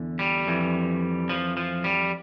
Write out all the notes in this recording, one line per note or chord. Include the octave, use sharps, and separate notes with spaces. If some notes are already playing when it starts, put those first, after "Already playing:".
Already playing: E2 D3
G3
F2 E3
F3
F3
G3